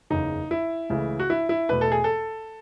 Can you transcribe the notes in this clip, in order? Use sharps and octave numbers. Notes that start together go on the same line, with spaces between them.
F#1 E2 C#3 D#4
E4
C#2 C#3 E3 A3
F#4
E4
E4
E2 B2 A3 B4
A4
G#4
A4